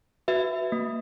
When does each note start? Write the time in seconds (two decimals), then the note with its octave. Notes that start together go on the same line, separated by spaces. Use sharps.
0.28 F#4 B4 E5
0.72 A#3